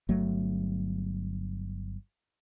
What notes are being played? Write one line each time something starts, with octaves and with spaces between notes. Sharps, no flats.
G1 F#3 A3